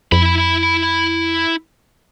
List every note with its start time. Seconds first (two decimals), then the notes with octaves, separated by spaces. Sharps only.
0.12 F2 E4 B5